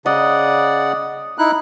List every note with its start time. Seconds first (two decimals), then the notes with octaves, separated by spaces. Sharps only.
0.06 C#3 D5 D#5 F#5
1.38 D#4 E4 F#6